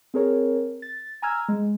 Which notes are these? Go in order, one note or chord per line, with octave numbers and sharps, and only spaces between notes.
C4 G#4 A#4 C#5
A6
G#5 A#5 E6 F6 G#6
G#3